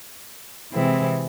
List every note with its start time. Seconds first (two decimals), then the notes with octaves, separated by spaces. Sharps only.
0.73 C3 E3 G#3 C4 E4